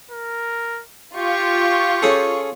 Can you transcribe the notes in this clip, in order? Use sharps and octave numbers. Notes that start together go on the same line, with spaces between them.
A#4
F4 G4 C#6
C#4 G#4 A4